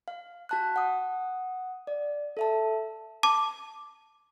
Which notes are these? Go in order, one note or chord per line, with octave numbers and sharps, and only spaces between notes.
F5
F#4 A5 F#6
F#5 D#6
D5
A4 E5 A5
A5 D6